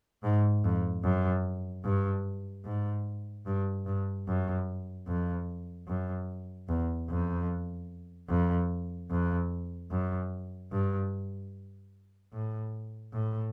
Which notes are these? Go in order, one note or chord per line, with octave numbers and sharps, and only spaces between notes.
G#2
F2
F#2
G2
G#2
G2
G2
F#2
F2
F#2
E2
F2
F2
F2
F#2
G2
A2
A2